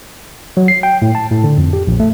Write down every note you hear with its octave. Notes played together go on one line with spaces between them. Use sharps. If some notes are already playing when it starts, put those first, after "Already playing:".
F#3
C7
G5
A2
A5
A2
D3
F2
G4
A#1
A3